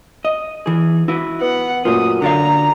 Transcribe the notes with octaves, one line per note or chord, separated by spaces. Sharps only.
D#5
E3 G#4
E4 F#4 B4
B3 F#5
F#2 A#2 A3 F4 D#6
D3 D5 F5 A#5